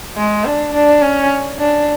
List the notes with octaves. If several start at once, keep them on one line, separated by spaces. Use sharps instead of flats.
G#3
D4
D4
C#4
D4